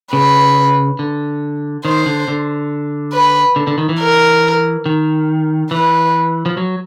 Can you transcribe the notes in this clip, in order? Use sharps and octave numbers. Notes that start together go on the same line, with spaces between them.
C#3 B4
D3
D#3 C5
D3
D3
B4
D3
D3
D#3
E3
A#4
D#3
E3 B4
F3
F#3